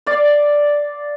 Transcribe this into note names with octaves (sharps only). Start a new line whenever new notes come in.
D5 F5